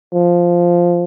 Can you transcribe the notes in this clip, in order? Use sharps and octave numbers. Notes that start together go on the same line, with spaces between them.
F3